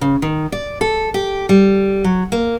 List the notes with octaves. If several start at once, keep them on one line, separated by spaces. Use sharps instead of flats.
C#3
D#3
D5
A4
G4
G3
F#3
A#3